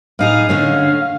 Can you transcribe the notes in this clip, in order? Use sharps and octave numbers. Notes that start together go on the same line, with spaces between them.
A2 D#4 G#4 F5
D3 A3 C#4